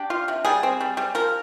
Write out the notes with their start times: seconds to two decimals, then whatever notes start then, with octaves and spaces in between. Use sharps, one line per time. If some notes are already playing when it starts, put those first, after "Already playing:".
Already playing: D4 G4
0.10 F4
0.28 C3
0.45 G3 G#4
0.63 C4
0.80 G3
0.97 G3
1.15 F3 A#4